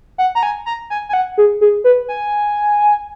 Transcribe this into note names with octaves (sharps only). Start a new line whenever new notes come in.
F#5
A#5
G#5
A#5
G#5
G#5
F#5
G#4
G#4
B4
G#5